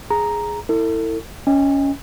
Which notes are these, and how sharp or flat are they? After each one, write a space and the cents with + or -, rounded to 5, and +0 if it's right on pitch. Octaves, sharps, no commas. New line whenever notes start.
G#4 +0 A#5 +0
E4 -5 A4 +35
C#4 +10 D#5 +15 G5 +45